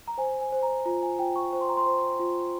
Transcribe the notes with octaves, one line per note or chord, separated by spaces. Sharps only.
A#5
C5 G#5
G#5
C5
A#5
F4 A#5
G#5
F4 G5
C#6
C5 C#6
C6
A#5
C6
C5
F4